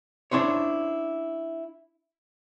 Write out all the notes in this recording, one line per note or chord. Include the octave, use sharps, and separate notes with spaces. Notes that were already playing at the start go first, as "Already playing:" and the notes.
C#4 D4 E4 C5 C#5